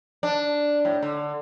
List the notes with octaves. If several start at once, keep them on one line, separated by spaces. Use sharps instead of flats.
D4
A2
D3